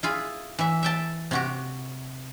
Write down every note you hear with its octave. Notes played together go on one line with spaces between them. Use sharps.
E4 F4 G#4
E3 E5
E5 G5 A5
C3 F#4 G4